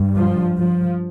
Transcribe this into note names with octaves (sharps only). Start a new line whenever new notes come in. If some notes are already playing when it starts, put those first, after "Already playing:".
Already playing: G2
F3
F3